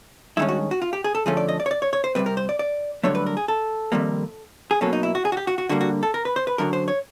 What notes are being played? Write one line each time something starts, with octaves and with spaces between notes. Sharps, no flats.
G2 D#3 G#3 C#4 E4
F#4
F#4
F4
G4
G#4
A4
D3 F3 A3 C#4 G#4
D5
D#5
D5
C#5
D5
C#5
C#5
C5
C3 D#3 G3 C4 B4
A#4
C5
D5
D5
G2 D3 F#3 A3 C#5
B4
A#4
G#4
A4
F2 C3 D#3 G3 A#3
G#4
B2 F#3 A#3 C#4 A4
D#4
E4
F#4
G#4
F#4
G4
F#4
F#4
D3 G3 A#3 F#4
F#4
A4
A#4
B4
C5
B4
F#2 D3 F#3 A#4
C5
C#5